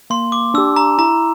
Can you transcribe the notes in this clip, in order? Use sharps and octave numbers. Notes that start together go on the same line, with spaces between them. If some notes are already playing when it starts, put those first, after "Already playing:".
A#3 C6
D6
D4 G4 E6
A#5
E4 A#5